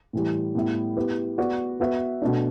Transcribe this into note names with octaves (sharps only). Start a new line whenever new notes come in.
A2 E3 G3
A2 G3 B3 E4
B3 E4 G4 B4
B3 F#4 B4 D5
B3 F#4 B4 E5
B2 A3 D4